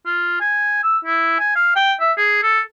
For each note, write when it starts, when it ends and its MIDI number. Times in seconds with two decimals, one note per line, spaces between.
0.06 0.38 65
0.40 0.81 80
0.83 0.98 88
1.05 1.36 64
1.40 1.55 80
1.56 1.73 77
1.76 1.93 79
2.00 2.12 76
2.17 2.39 68
2.43 2.60 69